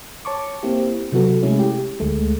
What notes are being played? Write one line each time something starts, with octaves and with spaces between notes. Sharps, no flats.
C#5 A5 C#6 D6
A#3 C4 E4 G4
C3 F#3 B3 F#4 A4
C3 G#3 A3 C#4 E4
G4
D2 G#3 A3